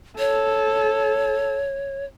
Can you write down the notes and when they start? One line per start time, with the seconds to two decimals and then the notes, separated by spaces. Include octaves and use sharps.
0.18 A4 C#5